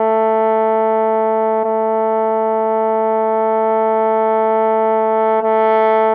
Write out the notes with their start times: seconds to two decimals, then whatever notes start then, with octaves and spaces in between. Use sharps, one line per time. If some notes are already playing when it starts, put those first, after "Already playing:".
Already playing: A3
1.65 A3
5.42 A3